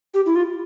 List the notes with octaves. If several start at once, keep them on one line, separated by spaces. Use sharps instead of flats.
G4
E4
F4